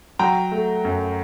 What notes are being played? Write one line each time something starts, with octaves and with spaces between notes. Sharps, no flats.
F#3 G5 A#5
A3
F#2